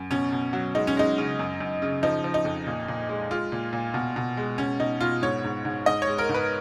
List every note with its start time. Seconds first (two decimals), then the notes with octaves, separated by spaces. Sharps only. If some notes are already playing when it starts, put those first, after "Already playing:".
Already playing: F#2
0.11 B2 C#4
0.32 B2
0.53 F#3
0.75 G#3 D#4
0.87 C#4
0.97 G#3 D#4
1.18 C#3
1.39 F#2
1.60 F#2
1.82 C#3
2.03 F3 D#4
2.24 F3
2.34 D#4
2.45 F2
2.67 A#2
2.88 A#2
3.09 G#3
3.31 G#3 F4
3.52 A#2
3.73 A#2
3.94 B2
4.16 B2
4.37 G#3
4.58 B2 C#4
4.79 B2 D#4
5.01 B2 F4
5.22 G#2 C#5
5.44 G#2
5.65 G#2
5.86 G#2 D#5
6.02 C#5
6.07 G#3
6.18 A#4
6.29 G#2
6.34 B4